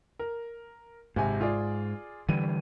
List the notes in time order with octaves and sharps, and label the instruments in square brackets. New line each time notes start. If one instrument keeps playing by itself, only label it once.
[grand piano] A#4
[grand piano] G#1 C3 G#5 [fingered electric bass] G#2
[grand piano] F4 G#4 D5
[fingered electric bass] D3 E3 G3 [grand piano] D#7